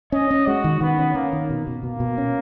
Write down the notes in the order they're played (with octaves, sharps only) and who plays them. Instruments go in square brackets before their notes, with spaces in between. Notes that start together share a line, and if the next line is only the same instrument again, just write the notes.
[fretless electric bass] C#4 [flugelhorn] D#5
[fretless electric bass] C#4
[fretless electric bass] G#3 [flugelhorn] F#4
[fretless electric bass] D#3
[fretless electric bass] D#3 [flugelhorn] B3
[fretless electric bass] C#4
[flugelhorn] A#3 [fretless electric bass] C#4
[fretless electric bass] D#3
B2
B2
[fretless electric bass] B2 [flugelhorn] A#3
[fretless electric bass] B2
C#4